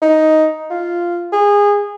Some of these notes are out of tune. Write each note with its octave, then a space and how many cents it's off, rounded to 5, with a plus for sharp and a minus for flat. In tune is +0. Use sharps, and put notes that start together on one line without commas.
D#4 +5
F4 -5
G#4 -25